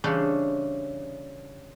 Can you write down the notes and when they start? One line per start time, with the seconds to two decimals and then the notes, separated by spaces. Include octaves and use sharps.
0.04 C#3 E3 G3 C#4 D4 C5